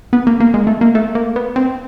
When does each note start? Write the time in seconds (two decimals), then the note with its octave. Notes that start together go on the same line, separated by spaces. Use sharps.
0.13 B3
0.27 A#3
0.40 A#3
0.54 G#3
0.67 A3
0.81 A#3
0.95 A3
1.15 A#3
1.36 B3
1.56 C4